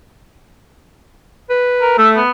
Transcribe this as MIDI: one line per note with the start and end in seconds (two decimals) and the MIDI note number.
1.50 1.95 71
1.81 1.97 70
1.98 2.20 57
1.98 2.09 76
2.16 2.31 59